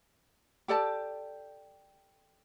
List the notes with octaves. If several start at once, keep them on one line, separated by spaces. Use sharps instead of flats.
G4 A4 D5 A5